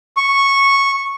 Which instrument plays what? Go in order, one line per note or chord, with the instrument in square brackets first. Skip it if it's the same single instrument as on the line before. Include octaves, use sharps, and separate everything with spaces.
[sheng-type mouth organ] C#6